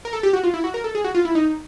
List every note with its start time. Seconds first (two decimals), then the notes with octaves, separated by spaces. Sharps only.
0.05 A#4
0.13 A4
0.23 G4
0.33 F#4
0.44 F4
0.54 E4
0.64 F#4
0.74 A#4
0.84 A4
0.95 G#4
1.04 F#4
1.15 F4
1.25 E4
1.35 D#4